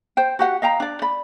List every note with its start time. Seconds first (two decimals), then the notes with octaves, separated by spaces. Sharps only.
0.17 C5 G5
0.39 F#4 G4 F#5
0.62 D#5 F5 G5 A#5
0.80 D4 D5
1.02 D5 B5